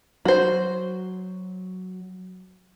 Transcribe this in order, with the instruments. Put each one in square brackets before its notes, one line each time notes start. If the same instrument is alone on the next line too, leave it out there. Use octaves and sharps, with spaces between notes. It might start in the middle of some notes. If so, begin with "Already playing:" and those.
[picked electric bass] F#3 [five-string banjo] F#4 C5